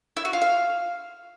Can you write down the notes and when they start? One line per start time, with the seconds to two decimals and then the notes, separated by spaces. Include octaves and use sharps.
0.17 E4
0.25 F#4
0.33 F4
0.42 F5